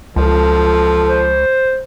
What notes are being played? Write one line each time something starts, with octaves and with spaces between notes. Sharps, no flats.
C#2 F3 A4
C5